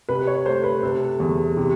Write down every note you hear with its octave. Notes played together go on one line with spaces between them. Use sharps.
C3 B4
C#5
A3 C5
B4
C3 A4
E2
C3